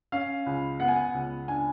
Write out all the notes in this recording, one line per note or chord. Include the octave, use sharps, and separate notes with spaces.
C#4 F5
C#2
B3 F#5
G#5
F#5
C#2
D4 G#5